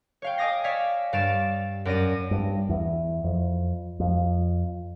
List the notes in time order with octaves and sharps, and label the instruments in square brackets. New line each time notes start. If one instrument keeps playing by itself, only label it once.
[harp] C#5 F5 G5
D#5 G#5 D6 D#6 A#6 C7
C#5 D5 F5 E6 G#6 B6
G2 G3 F5 A6 D7 E7
F#2 D5 A#6 D#7
[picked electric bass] G2
E2
F2
F2